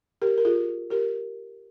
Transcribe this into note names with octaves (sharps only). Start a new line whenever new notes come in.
G4 A#4
A#4
F4 G#4
G4 A#4